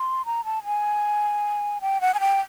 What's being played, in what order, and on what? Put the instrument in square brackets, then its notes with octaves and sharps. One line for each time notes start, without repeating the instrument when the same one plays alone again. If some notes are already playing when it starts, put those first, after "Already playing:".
Already playing: [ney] C6
A#5
A5
G#5
G5
F#5
G#5
G5